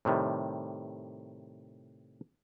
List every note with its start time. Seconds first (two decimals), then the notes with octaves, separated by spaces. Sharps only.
0.05 A2 C3 D#3 G3